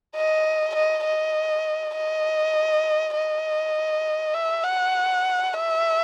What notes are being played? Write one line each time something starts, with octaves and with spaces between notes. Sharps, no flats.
D#5
D#5
D#5
D#5
D#5
E5
F#5
E5